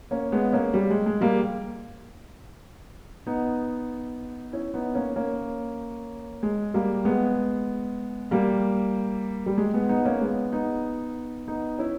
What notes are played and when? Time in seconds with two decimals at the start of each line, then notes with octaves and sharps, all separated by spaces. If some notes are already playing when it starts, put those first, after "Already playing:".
0.11 A#3 C#4
0.32 G#3 B3
0.53 A#3 C#4
0.74 G3
0.90 G#3
1.06 G#3
1.21 G3 A#3
3.27 B3 D#4
4.53 C#4 E4
4.74 B3 D#4
4.95 A#3 C#4
5.16 A#3 C#4
6.43 G#3
6.74 G3 A#3
7.05 G#3 B3
8.31 G3 A#3
9.46 G3
9.58 G#3
9.74 G#3 B3
9.89 B3 D#4
10.05 A#3 C#4
10.21 G#3 B3
10.52 B3 D#4
11.48 B3 D#4
11.79 C#4 E4